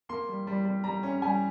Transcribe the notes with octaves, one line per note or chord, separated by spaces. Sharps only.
A#3 C6
G3
G3
G3
G3 A#5
C#4
G3 G#5